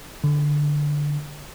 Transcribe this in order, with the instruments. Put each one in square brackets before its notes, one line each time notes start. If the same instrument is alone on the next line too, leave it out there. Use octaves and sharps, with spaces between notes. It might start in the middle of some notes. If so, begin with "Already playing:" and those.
[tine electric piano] D3